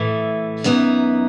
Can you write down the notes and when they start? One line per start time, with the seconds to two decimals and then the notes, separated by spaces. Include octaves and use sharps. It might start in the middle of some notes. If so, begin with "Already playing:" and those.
Already playing: A2 E3 A3
0.64 F#2 E3 B3 D#4